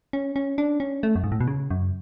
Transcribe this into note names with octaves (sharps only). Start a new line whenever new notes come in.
C#4
C#4
D4
C#4
A3
F#2
G#2
A2
B2
C#3
F#2